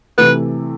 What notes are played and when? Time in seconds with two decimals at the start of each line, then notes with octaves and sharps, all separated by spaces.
0.18 C3 E3 A3 B4